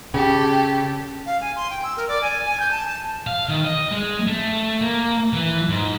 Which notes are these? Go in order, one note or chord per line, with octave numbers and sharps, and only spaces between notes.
C#3 G4 A4
F5
G#5
C6
G5
E6
A#4
D5
G#5
G#5
G6
A5
A5
F5
D#3
D#5
G#3
A3
A#3
E3
G#2